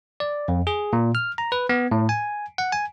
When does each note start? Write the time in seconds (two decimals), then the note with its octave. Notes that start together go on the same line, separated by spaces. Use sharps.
0.20 D5
0.48 F2
0.67 G#4
0.93 A#2
1.15 F6
1.38 A#5
1.52 B4
1.69 B3
1.91 A2
2.09 G#5
2.58 F#5
2.72 G#5